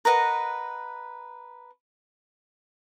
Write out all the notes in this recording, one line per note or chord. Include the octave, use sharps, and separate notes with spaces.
A#4 B4 D#5 F#5